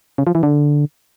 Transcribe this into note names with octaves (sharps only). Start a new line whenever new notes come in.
C#3
F3
E3
D3